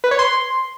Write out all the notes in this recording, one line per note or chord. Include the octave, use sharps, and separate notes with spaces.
B4
C#5
C6